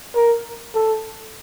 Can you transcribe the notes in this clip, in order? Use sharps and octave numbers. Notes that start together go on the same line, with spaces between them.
A#4
A4